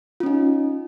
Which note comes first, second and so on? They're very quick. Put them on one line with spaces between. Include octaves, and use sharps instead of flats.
F4 C#4 D#4